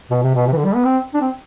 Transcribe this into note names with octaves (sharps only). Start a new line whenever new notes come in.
B2
C3
B2
C3
E3
D3
G3
B3
C4
D4
C4